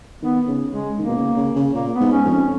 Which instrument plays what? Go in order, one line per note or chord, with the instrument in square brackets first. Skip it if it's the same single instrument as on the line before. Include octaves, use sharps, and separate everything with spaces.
[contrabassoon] D#3 [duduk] B3
[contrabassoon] C#3
[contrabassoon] C#3 [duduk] G#3
[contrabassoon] D#3 [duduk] A#3
[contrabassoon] B2
C#3
C#3
C#3
[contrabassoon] A#2 [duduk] A#3
[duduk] B3
[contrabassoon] G#2
[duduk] C#4
[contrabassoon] F2
[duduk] C#4